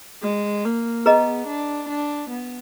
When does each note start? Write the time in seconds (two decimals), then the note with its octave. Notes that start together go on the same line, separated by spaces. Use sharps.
0.22 G#3
0.65 A#3
1.06 B3 G#4 B4 D#5 A#5
1.48 D4
1.89 D4
2.31 B3